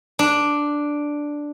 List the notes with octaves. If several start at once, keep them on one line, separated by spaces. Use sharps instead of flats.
D4